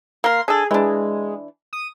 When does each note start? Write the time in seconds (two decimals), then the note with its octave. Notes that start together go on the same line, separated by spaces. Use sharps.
0.24 A#3 A#4 C6
0.48 D4 G#4 A4
0.71 E3 G#3 D4
1.73 D#6